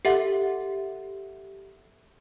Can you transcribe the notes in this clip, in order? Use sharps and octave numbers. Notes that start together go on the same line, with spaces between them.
G4 A4 E5 F#5